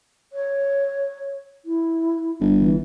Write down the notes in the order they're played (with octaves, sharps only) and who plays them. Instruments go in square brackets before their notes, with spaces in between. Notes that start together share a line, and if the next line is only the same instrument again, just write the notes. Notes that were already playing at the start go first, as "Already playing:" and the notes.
[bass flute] C#5
E4
[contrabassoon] G1
[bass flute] E3